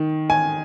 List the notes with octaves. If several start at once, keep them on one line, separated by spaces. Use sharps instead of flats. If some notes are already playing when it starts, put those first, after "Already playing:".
Already playing: D#3
G#5